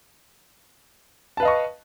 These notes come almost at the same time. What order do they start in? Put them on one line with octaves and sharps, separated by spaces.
A5 B4 F5 D#5 C#6